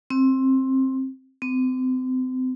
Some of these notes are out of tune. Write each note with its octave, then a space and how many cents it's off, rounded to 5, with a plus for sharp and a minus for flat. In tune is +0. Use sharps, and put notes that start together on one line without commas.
C4 +15
C4 -35